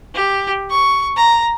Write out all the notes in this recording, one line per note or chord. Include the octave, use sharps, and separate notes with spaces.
G4
C#6
A#5